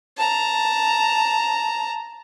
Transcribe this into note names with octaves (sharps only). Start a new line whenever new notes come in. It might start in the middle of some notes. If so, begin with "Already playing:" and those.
A5 A#5